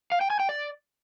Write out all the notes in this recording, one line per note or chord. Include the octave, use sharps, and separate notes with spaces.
F5
G5
G#5
G5
D5